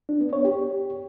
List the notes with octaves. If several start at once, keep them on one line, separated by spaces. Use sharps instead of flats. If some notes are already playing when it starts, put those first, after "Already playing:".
D4
B3
C#5
G4